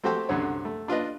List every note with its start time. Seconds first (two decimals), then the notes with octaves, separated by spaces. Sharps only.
0.03 A3 C4 F#4 G4 A4 C5
0.29 C2 F#2 D3 C#5
0.65 A3
0.88 D4 F4 B4 D#5